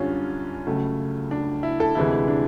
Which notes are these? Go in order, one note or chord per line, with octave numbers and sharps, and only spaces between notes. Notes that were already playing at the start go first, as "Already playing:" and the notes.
Already playing: F#2 D3 G3 C#4 D4 F4
C#2 C#3 F#3 A3
D4
E4
A4
D2 C3 E3 G#3 E4
D4